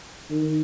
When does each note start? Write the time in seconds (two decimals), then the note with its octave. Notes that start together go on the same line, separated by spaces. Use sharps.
0.30 D#3